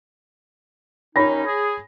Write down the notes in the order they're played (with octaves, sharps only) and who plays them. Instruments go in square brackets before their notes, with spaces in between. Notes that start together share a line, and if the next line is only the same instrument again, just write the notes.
[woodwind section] D#2 C#4 D#4 [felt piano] C#5 B5 A#6
[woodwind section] G#4